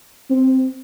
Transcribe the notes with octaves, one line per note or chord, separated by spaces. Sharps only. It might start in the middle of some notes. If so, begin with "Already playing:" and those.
C4